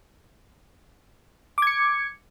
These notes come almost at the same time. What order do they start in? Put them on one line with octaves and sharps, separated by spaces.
D6 G#6 C#7